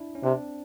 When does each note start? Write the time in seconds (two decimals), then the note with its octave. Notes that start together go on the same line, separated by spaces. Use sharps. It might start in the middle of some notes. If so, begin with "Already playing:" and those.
Already playing: D4 E4
0.15 C#4
0.23 C3 C4 D4